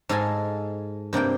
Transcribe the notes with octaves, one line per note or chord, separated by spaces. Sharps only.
G#2 A4 D#5 F5 G#5
G2 C3 A#3 G5